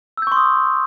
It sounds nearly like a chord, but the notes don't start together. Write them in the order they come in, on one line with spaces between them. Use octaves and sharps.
E6 G6 C#6 C6 D#6